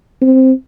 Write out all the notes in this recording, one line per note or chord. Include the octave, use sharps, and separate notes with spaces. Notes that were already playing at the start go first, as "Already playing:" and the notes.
C4